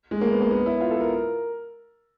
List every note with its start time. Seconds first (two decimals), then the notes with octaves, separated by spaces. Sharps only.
0.11 G#3
0.21 A#3
0.31 B3
0.41 A#3
0.51 B3
0.66 E4
0.81 F4
0.91 A4
1.00 A#4